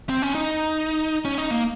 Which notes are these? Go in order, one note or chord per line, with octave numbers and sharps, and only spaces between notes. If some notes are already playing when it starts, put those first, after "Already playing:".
C4
C#4
D#4
C#4
D#4
A#3